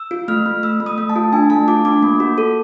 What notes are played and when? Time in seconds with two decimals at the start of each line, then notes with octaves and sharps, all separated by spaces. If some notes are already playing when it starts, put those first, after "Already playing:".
Already playing: E6
0.11 F4
0.28 A3 F6
0.46 A3
0.63 A3 E6
0.80 A3
0.86 D#6
0.98 A3
1.10 A5
1.16 F4
1.33 D4 G#5
1.50 A3 A5
1.68 F4 D6
1.85 D4 D6
2.03 A#3
2.20 F#4
2.38 A4